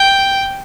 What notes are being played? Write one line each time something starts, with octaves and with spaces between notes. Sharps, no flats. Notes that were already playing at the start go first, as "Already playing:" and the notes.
Already playing: G5